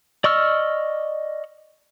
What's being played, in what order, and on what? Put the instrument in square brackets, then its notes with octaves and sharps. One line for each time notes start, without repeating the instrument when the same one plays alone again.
[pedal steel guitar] D5 D#5 C#6 E6 F6